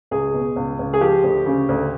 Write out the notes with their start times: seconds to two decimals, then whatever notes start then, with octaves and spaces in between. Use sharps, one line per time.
0.11 C#2 G#4
0.34 B2
0.56 C#2
0.79 C#2
0.94 G#4
1.01 F3 G4
1.24 D2
1.46 C#3
1.69 D2